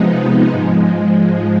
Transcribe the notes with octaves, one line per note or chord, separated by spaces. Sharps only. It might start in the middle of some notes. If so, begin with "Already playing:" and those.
Already playing: C3 F3 G#3 B3 D#4
G#2 F3 G#3